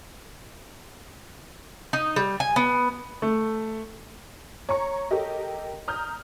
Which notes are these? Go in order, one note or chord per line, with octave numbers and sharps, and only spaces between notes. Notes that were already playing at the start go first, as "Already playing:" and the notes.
D#4
G3
G#5
B3
A3
C#5 A#5 C#6
G4 A4 A#4 D#5
A#5 D#6 F6 G6